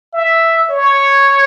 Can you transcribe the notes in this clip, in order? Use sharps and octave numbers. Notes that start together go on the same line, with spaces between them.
E5
C#5